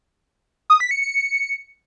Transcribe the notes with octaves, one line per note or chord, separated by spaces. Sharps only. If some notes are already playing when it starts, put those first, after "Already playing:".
D#6
B6
C#7
C#7